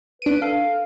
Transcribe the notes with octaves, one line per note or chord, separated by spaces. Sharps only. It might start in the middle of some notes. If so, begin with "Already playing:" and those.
D4 B4 D7 D#7
A4 F5